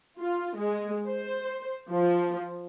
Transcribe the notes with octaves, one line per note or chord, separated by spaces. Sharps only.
F4
G#3
C5
F3